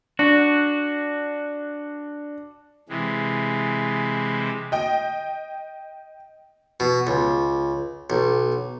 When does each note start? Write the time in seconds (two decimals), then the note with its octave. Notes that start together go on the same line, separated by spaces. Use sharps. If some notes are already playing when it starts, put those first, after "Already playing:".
0.19 D4 F#4
2.89 C3 E3 G#3
4.72 D#5 G5
6.80 B2
7.07 C#2
8.10 B1